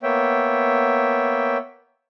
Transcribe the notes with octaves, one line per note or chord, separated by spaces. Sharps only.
A#3 B3 C#5 E5 G5